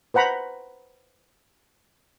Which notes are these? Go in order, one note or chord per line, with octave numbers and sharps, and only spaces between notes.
B4 C5 F#5 A#5 B5